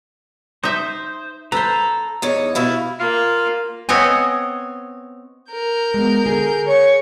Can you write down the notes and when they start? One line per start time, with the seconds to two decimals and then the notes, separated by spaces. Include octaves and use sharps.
0.64 D#4 C5 E5
1.52 A4 B4 C5 A#5
2.22 E2 D#4 C#5
2.55 B2 E4 F5
2.99 A#3 F4 F5
3.89 B3 C4 C#5 D#5 G#5
5.51 A#4 G6
5.94 G#3 B3
6.26 D3 G#4 G#5
6.68 C#5 C#6